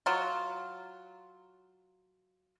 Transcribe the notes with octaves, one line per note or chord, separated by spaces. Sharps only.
F#3 F4